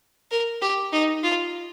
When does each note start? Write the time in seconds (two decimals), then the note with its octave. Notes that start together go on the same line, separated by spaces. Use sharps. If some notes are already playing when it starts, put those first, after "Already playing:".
0.31 A#4
0.61 G4
0.92 D#4
1.23 F4